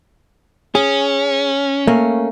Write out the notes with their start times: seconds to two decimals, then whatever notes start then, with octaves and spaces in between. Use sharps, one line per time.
0.75 C#4 G#4
1.87 A3 A#3 C#4